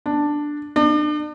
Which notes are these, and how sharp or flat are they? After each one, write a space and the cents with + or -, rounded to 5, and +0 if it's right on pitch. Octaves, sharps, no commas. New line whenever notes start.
D4 +5
D4 +40